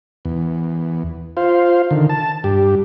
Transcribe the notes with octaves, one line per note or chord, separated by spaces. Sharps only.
E2
F4 C5 F5
D3 D#3
A5
G2 G4